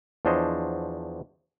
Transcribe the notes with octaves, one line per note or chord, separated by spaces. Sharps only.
E2 F3 D4 C5 C#5 D#5